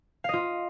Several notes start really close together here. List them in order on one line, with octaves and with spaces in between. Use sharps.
F5 D#5 F4